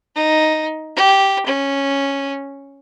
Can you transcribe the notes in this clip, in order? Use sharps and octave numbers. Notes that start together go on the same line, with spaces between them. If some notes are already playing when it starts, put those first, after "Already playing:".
D#4
G4
C#4